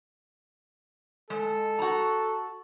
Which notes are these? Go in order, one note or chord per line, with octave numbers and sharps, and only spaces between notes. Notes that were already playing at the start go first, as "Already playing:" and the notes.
G#3 A4
F#4 A#5